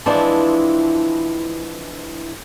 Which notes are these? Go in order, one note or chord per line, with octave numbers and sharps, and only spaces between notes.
E3 F3 G#3 C4 D4 E4